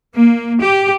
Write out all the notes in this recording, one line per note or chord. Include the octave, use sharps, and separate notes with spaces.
A#3
G4